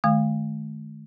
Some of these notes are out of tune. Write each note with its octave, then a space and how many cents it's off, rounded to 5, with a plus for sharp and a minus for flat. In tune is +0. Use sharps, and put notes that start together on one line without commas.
D#3 -30 A3 -40 F5 +0